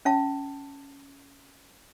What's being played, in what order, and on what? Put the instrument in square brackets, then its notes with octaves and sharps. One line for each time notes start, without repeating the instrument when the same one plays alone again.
[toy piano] C#4 F5 A5